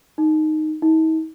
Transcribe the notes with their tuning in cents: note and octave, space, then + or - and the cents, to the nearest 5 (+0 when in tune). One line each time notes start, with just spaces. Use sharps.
D#4 -5
D#4 +45